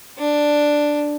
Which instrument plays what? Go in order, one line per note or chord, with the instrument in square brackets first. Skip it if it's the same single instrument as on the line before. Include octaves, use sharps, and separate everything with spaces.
[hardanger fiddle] D4